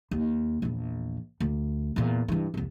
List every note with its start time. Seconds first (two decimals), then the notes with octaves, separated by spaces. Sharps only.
0.11 D#2
0.62 A#1 E2
1.40 D2
1.96 E2 A#2
2.28 G2 E3
2.54 C2 F2